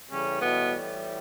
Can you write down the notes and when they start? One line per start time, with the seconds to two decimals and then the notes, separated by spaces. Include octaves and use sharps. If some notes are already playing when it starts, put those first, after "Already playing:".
0.11 A2 C#3 E3 G3 C#4
0.41 B2 B3